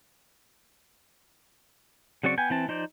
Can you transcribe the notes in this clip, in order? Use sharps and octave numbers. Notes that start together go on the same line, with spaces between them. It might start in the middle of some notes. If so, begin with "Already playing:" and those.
C#3 F#3 C4 D5 C#6
B3 G5 G#5
E3 C4 A5
F3 D#4 C5 D5